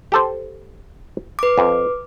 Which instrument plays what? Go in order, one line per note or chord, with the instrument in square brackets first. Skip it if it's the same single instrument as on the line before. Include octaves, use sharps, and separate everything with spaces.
[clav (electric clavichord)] G4 A4 C5
[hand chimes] B4 D6
[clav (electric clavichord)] F2